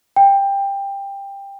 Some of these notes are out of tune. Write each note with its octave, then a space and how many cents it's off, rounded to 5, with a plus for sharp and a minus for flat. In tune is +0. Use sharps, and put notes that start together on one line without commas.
G5 +15